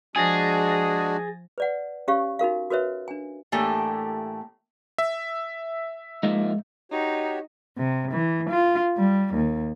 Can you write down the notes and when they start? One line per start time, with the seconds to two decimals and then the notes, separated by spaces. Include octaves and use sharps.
0.16 F3 G#3 D4 F#4 G#4 G#5 A6 A#6
1.58 B4 D5 F#5
2.08 C#4 G4 C#5 F5 C#6
2.39 D#4 F#4 A#4 F5
2.70 F#4 A#4 B4 C#5 E5
3.08 D4 G#5
3.52 A2 E3 A3 A#3 D4 G4
4.98 E5
6.23 F3 G#3 A#3 D#4
6.92 D#4 F#4 G4 C#5
7.78 C3
8.12 E3
8.49 F4
8.97 G3
9.34 D#2